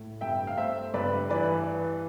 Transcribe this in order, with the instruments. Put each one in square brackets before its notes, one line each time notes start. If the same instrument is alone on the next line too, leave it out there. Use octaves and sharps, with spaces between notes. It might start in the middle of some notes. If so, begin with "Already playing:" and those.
Already playing: [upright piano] A2
G2 E5 G5
F5
A3 C5 E5
G2 B4 D5
E3 B4 D5